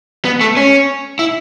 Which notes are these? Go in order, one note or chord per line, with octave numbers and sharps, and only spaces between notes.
B3
A3
C#4
E4